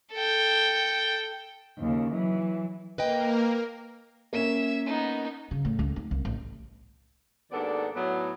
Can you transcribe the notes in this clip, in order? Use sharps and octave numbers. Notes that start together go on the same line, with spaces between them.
A4 G5
D#2 C#3
E3 F#3
A#3 A#4 B4 D#5 G5
A#3 C#4 E5 E7
B3 D#4
C#3
A2
C#2
D#4
C2
A1
D#2 G#2 B3 D4 A4 D5
A2 F#3 B3